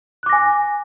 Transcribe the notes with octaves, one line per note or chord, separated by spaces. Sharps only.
G#5 D6 F#6 A#6